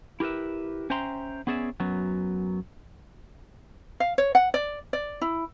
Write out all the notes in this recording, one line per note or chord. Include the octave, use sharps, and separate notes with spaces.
E4 G4 A#4 B4 E5
C#4 C5 E5 G5 A#5 C6
B3 C#4 G#4 D5 E5
F#2 F#3 B3
F5
C#5
F#5
D5
D5
E4